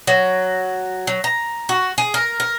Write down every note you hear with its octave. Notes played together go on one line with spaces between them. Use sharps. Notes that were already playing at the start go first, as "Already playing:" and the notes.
F#3
F#3
A#5
F#4
G#4
A#4
A#4